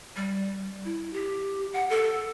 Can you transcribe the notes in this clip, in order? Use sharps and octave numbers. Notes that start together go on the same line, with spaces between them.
G3
E4
G4
F#5
A4